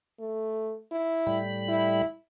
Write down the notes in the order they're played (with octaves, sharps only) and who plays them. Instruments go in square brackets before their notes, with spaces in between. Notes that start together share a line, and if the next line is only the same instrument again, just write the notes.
[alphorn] A3
E4
[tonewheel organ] A2 G3 B5
[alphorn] E4